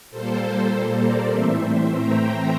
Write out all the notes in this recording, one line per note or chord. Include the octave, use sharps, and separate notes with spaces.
A#2 G3 A#3 A4 C5
A#4 D5
A2 E3 A3 C4 C5 E5
G5 A#5
G5 A#5